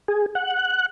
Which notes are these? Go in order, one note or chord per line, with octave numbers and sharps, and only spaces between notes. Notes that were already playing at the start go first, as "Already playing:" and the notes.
G#4
F#5